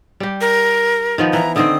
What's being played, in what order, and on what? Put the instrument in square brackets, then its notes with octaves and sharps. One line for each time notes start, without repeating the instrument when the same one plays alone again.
[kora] G3 G4
[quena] A#4
[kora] D#3 F3 B3
[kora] E3 [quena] A#5
[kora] D3 D#3 C4 [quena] D#6